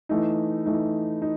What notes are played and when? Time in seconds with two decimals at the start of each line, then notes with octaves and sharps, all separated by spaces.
0.09 E3 A3 D#4
0.66 E3 A3 D#4
1.22 D#4